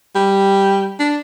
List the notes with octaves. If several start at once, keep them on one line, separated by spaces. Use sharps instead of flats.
G3
D4